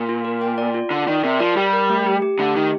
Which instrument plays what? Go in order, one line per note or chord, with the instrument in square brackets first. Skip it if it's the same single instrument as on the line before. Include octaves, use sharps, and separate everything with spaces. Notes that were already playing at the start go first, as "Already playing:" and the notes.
Already playing: [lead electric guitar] A#2
[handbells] F4
A#4
G5
D5
F4
[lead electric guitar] D3 [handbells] D5
[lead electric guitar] D#3 [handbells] D5
[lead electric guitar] C3 [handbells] A#4
[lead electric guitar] F3 [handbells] D5
[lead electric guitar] G3 [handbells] G4
[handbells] A#4
A3
G4
G4
[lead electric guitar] D3 [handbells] A3
[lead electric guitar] D#3 [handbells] G4